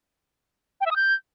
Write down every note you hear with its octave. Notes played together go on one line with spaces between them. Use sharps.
G5
E5
D#6
G6